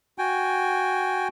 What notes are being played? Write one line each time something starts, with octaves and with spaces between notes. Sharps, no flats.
F#4 G5 G#5